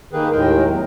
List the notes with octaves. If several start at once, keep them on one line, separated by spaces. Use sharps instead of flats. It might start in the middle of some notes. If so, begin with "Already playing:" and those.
D#3 A#3 G4 G#4 B4
D#2 A2 D#3 G#3 A#4 G5
E2 A2 F#3